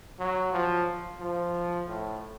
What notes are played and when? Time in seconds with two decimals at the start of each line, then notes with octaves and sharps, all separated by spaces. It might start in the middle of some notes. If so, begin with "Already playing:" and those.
0.19 F#3
0.53 F3
1.20 F3
1.87 A2